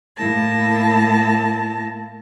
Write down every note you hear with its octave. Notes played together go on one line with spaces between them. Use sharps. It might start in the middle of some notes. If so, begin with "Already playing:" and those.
A2 A#3 E4 A5 A#6